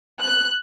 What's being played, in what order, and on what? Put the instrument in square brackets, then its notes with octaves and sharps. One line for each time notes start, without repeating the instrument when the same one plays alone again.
[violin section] F#6